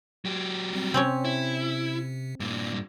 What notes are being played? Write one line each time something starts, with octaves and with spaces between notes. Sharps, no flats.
F#3 G4
G3 C4
C3 C4 C#4 C#5
E4
G2 A#2 G3